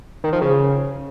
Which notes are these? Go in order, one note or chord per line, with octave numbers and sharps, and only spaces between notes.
D#3
F3
C#3